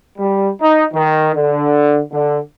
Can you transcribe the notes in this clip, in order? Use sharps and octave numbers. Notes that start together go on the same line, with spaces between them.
G3
D#4
D#3
D3
D3